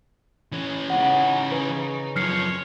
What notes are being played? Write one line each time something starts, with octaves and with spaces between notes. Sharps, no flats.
E3 C#4
C#3 D#4 F#5
B4
F#2 F3 C#5 F6 C7 C#7